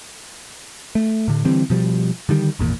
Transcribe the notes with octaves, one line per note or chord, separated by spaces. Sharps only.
A3
A2 D3
D3 E3 G3 C4
B2 F3 G3
D3 D#3 G3
G#1 E2 A#2